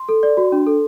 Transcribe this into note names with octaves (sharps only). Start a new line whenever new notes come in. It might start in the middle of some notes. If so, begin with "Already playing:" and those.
Already playing: C6
A4
D5
F#4
D4
A4